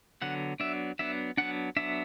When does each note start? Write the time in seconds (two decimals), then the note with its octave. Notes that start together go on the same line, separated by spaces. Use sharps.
0.22 D3 F#3 B3 F#5
0.60 F#3 B3 D4 E5
0.99 F#3 B3 D4 E5
1.37 F#3 B3 D4 F#5
1.76 F#3 B3 D4 E5